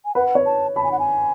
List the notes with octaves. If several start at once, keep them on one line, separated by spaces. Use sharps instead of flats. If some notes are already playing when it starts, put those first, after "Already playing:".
G#5
B4 F#5
C#5
A5
A5 B5
G#5
F#5
G#5